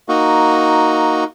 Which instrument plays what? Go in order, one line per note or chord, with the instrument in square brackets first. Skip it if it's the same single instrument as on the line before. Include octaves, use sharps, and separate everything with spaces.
[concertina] A#3 D#4 F#4